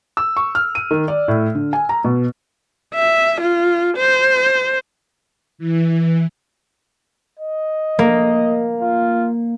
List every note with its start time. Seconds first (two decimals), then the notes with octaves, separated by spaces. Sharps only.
0.17 E6
0.37 C#6
0.55 F6
0.75 D#7
0.91 D#3
1.08 D5
1.28 A2
1.55 D3
1.73 G#5
1.89 A#5
2.04 B2
2.95 E5
3.41 F4
3.97 C5
5.58 E3
7.40 D#5
7.99 A#3
8.82 F4